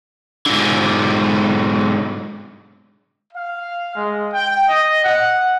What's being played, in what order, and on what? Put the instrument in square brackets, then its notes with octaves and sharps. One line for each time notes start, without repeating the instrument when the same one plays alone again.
[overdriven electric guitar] G#2 D3
[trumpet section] F5
G#3
G5
D#5
F#5